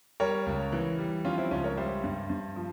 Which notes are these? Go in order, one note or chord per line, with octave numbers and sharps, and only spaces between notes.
G3 A#4 C#5
C#2
E3
G3
F3 C#4 F4
C4 E4
C#2 C#4 F4
A#4 C#5
G3 C5 E5
G2
G2
F3